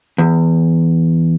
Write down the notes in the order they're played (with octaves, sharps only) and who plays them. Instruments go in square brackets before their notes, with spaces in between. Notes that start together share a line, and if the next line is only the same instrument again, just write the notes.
[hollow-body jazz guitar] E2